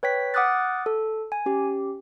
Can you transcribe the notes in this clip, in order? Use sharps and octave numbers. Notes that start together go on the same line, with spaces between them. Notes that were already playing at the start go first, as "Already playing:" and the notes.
B4 C#5 G5 G6 B6
F#5 D6 D#6 F6 F#6 A6
A4
G#5
C#4 G4